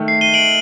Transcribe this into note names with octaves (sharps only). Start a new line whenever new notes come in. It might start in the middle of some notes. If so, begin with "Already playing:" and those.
Already playing: D#3 A3
C7
D#7 G7
D7 F#7